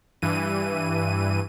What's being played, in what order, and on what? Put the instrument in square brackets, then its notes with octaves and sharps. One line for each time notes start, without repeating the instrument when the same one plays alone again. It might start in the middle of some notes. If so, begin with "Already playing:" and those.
[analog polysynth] G2 E3 D#7